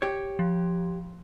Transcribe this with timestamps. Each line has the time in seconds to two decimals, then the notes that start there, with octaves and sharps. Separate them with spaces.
0.02 G4 C#5
0.39 F3